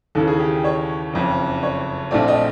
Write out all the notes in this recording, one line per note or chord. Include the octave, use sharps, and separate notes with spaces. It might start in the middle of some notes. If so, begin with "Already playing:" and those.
D#2 C#3 E3 A4
G#4
G4
C#5
F#1 F2 C#3
C#5
A#1 A#2 F3 A3 C4 D5
D#5